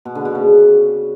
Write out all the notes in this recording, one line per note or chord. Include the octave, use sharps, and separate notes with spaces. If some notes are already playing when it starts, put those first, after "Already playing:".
B2
D3
B2
C#3